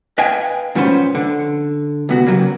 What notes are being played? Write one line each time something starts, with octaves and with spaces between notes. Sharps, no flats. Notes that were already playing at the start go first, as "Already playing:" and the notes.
B4 D#5 F5 G5 G#5
G#2 F3 C#4 B4 C5
D3
C2 B3 F#4
C#3 F#3 A#3